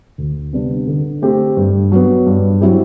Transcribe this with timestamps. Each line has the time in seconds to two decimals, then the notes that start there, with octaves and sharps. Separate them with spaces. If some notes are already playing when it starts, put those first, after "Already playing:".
0.18 D2
0.53 C3 G3 B3 D4
0.87 D3
1.22 A3 C4 G4
1.57 G2
1.92 F#3 B3
2.26 G2
2.61 F#3 C4 E4 G4